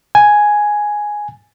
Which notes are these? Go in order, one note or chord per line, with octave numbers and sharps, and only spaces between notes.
G#5